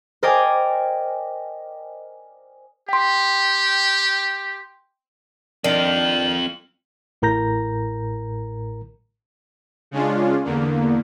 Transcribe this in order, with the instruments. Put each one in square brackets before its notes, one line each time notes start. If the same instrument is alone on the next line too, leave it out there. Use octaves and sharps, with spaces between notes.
[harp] A#4 C5 D5 D#5 G5 G#5
[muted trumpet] G4 [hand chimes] G5 C6
[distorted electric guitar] F2 F4 [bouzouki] D#3 [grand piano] D4 [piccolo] F#7
[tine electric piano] A1 A2 A#4 A#5 G6 A#6
[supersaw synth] C#3 G#3 C#4 D4 F4
E2 D3 A#3